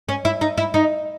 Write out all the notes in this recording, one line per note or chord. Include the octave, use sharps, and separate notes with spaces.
C#4
E4
D#4
E4
D#4